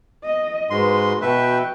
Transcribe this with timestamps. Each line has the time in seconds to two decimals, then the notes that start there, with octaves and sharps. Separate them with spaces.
0.24 D#5
0.70 G#2 G#3 F#4 B4 C6
1.22 B2 F#4 B4 E5 G5